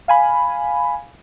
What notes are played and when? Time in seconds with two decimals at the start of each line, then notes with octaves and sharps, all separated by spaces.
0.08 F5 G#5 B5